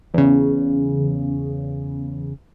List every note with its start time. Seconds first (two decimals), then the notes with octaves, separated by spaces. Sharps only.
0.14 E2 C#3